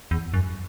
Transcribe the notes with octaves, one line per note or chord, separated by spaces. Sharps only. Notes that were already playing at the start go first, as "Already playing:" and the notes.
E2
F#2